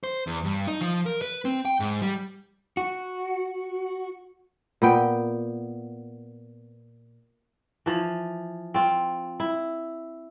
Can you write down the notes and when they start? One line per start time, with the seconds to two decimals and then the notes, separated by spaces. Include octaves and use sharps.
0.04 C5
0.27 E2
0.45 G2
0.67 D#4
0.81 F3
1.06 A#4
1.22 B4
1.45 C4
1.65 G5
1.80 G#2
2.02 G3
2.77 F#4
4.82 A#2 B3 G5
7.86 E3 F3
8.74 C4 F4
9.40 E4